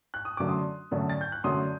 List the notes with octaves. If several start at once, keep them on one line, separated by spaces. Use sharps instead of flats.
F#6
D#6
F#2 D3 F#3 A3 D4 D6
C6 D#6
F#2 D3 F#3 A3 D4
A6
G6
F#6
F#2 D3 F#3 A3 D4 C6 D#6